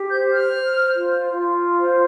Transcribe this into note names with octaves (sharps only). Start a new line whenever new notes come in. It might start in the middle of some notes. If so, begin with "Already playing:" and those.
Already playing: G4
C5 G6
F6
C5
F4
F4
C5